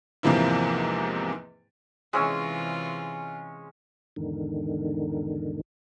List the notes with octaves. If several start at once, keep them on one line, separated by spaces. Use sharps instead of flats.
E2 G#2 C3 F3 A#3 E4
C3 E3 G#3 C#4 F4 E6
E2 G#2 D3 D#3